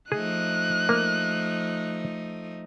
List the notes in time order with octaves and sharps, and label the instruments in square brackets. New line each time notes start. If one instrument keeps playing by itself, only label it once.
[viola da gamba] F3 A3 D#4 [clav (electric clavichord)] G#4 [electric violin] F#6
[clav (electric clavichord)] A#3